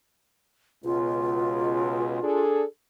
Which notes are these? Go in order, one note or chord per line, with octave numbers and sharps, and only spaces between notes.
C#2 B2 F4
D4 G#4 A4